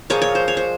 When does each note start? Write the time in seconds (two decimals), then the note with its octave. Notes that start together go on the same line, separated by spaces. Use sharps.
0.10 A#2 F3 G#3 C#5
0.22 C#5
0.35 C5
0.48 C#5
0.57 C5